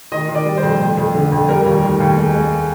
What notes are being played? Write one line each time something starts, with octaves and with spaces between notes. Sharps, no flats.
D#3 D#5
D#3
D5
G3
C5
F2
F2
F2
D3
F2
G3 A#4
D#2
D#3
D#2
G#3
G#3